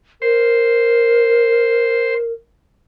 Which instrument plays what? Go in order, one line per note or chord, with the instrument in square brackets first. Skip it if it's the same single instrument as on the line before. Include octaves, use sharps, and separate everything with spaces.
[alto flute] A#4 [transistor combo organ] C5